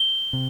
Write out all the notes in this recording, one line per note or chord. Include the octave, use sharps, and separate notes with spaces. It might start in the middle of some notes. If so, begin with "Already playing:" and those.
Already playing: G7
C3